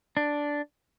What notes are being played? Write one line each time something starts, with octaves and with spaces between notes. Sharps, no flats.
D4